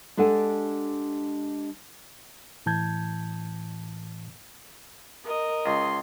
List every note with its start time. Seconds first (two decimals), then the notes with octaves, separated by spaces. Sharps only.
0.17 G#3 D4 G4 A4 F#5 G#5
2.66 A2 E3 A5 G6 G#6
5.24 A#4 D#5
5.66 C#2 C6